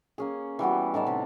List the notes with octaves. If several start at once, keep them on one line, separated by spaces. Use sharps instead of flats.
A#3 C#4 G#4
E3 G3 B3 F#4
A2 D#4 D5 A5
C3 G4